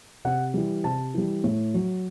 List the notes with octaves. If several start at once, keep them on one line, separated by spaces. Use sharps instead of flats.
C3 F#5
E3 G3
C3 A5
E3 G3
A2
F#3